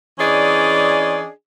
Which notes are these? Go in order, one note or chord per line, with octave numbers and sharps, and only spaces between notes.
E3 C#4 D4 G#4 D5 D#5